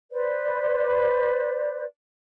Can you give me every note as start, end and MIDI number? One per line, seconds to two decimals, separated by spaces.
0.12 1.85 71
0.12 1.85 72
0.12 1.85 74